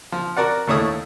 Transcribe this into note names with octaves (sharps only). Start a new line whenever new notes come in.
F3
F#4 A#4 D5 F#5
D#2 A2 A3 E4 C#5 D#6